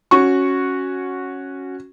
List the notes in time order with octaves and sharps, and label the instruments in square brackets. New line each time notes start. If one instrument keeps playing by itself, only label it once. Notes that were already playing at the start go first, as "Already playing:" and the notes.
[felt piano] C#4 F#4 C#6